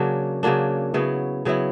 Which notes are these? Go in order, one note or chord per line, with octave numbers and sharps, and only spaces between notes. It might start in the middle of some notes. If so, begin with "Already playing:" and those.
Already playing: C#3 F#3 A#3 D4
C#3 F#3 A#3 D4
C#3 F#3 B3 E4
C#3 F#3 B3 E4